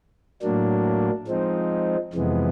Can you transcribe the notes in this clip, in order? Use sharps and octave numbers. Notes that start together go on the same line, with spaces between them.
A2 F#3 A#3 D4
F3 G#3 C4 D#4
F2 C3 E3 G#3 B3